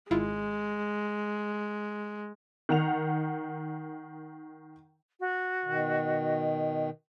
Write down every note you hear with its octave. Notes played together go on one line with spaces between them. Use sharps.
G#1 G#3 E4 F4
D#3 F#5 F7
F#4
B2 D#3